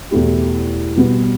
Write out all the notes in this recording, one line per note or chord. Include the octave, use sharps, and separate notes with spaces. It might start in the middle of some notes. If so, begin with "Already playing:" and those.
E2 B2 A3 E4 G4
B2 G3 B3